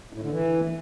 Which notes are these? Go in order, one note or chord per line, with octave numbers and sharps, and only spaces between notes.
A2
D3
E3